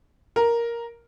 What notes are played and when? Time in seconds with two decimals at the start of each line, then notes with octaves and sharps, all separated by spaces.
0.36 A#4